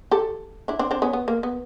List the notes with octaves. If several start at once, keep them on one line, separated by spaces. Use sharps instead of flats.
G4 A4
D4 E4
C4 D4
C4 D4
B3 C#4
B3
A#3
B3